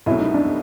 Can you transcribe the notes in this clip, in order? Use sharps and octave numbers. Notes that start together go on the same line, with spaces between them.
C2 B2 F#3 A3 C#4 E4
D#4
D4